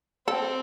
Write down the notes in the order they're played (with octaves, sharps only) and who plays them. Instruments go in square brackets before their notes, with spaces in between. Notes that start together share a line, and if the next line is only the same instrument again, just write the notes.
[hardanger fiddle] C4 [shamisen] A4